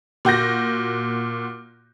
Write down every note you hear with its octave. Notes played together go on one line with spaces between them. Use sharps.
A#2 F#4 G6 A#6